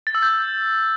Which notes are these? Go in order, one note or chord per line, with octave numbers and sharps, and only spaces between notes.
A6
E6
G6